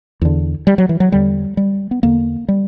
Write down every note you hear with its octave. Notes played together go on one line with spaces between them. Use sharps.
E2 D3
G3
F#3
E3
F#3
E2 D3 G3
G3
B3
E2 D3 A#3
G3